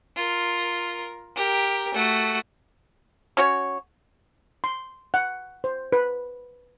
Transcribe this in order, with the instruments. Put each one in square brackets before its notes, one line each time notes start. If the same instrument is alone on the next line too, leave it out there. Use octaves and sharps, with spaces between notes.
[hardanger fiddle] F4 A#4
G4 A#4
A3 F#4
[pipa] C#4 F#4 C#5
[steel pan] C6
F#5
C5
B4